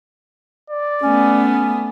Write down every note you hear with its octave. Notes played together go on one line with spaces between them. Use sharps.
D5
A3 B3 C#4